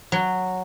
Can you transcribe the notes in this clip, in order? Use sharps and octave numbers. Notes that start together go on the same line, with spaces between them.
F#3